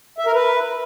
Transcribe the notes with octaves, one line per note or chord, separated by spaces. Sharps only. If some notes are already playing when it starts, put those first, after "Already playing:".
E5
A#4
B4